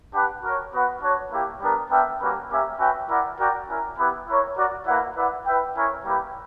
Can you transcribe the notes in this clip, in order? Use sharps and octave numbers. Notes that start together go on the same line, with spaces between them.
D4 G4 B4 F#5
F#4 A#4 C#5
B3 F#4 B4 F#5
D4 F#4 C#5
A#3 E4 G4
G3 B3 D4 A#4
B3 D4 A#4 E5 G5
G3 A#3 C#4 F#4 B4
A#3 C#4 G4 A#4 E5
C#4 F#4 B4 E5 G5
E4 A#4 D5 F#5
F#4 A#4 D5 G5
C#4 E4 A#4
B3 E4 G4 B4
E4 A#4 C#5
F#4 A#4 D5
A#3 E4 B4 F#5
E4 B4 D5 F#5
E4 B4 E5 G5
C#4 E4 A#4 C#5
G3 A#3 E4 G4 B4